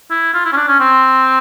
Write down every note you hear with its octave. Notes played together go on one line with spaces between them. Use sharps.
E4
F4
E4
C#4
D4
C#4
C4